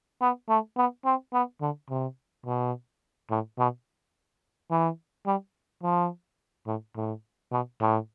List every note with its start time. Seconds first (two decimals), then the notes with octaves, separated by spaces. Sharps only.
0.21 B3
0.49 A3
0.77 B3
1.05 C4
1.34 B3
1.61 D3
1.90 C3
2.46 B2
3.30 A2
3.59 B2
4.71 E3
5.27 G3
5.83 F3
6.67 A2
6.96 A2
7.51 B2
7.80 A2